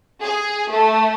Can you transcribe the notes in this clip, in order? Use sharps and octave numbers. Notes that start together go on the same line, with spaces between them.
G#4
A3